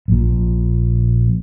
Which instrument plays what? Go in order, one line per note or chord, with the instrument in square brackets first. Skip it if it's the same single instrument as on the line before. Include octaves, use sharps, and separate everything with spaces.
[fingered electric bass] A#1 A#2